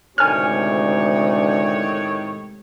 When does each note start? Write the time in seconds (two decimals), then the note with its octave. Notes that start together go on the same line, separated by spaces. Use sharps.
0.18 D2 A2 C3 D#3 G#3 C#5 G#5 F6